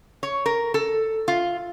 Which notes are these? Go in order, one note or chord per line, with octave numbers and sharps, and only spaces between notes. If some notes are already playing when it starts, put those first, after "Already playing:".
C#5
A#4
A4
F4